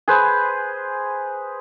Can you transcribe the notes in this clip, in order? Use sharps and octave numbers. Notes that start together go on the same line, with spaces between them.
G#4 B4 C5